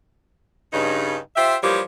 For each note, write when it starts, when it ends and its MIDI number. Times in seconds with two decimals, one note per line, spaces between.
0.73 1.17 43
0.73 1.17 49
0.73 1.17 63
1.36 1.56 65
1.36 1.56 67
1.36 1.56 72
1.36 1.56 76
1.62 1.80 52
1.62 1.80 53
1.62 1.80 55
1.62 1.80 58
1.62 1.80 67
1.62 1.80 73